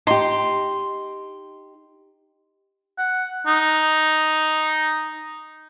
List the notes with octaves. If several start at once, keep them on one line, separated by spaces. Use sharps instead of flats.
D#4 G4 C6
F#5
D#4